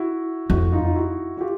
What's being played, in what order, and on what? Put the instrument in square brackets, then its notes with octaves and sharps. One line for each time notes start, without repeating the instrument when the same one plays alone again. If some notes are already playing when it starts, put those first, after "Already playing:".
Already playing: [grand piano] E4 F#4
[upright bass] F2 [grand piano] E4 F#4
[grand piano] D#4 F4
F4
E4 F#4
F#4
F4 G4